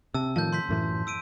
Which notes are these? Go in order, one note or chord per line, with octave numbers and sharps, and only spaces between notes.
C3 A5 E6
A2 D#3 F3 A5 G6
C6 G6 B6
F#2 A2 E3
E6 D7 D#7